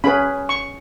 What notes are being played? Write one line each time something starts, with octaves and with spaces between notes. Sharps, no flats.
C#4 G#4 B4 B5
C#6